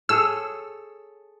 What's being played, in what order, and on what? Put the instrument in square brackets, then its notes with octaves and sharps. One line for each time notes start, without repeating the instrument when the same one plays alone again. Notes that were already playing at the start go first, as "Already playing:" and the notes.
[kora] G#4 A4 C#5 [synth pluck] E6